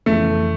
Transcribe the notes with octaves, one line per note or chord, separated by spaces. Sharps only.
F2 C#3 E3 A3